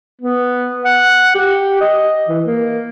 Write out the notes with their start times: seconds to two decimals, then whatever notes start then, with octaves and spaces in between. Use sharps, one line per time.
0.21 B3
0.85 F#5
1.35 G4
1.81 D#5
2.29 E3
2.45 A#3